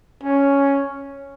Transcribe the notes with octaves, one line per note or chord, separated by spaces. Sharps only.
C#4